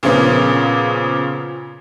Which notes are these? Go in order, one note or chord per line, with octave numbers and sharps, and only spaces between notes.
A#2 C#3 F3 A#3 B3 C#4